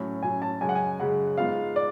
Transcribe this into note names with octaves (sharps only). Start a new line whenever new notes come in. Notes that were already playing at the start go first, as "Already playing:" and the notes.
Already playing: A2 F#3 C#4
A2 F#3 C#4 G#5
A5
F#2 C#3 G#3 G#5
F#5
G#5
F#2 C#3 G#3 F#5
G#2 G#3 B3 F4 F5
D5